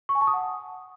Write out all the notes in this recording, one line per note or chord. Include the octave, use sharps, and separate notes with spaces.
C#6
G#5
A5
D#6
F#5